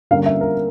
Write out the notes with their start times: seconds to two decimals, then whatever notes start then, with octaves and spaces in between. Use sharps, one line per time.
0.11 D3 G3 A#3 C#4 F5
0.26 E5
0.41 A#4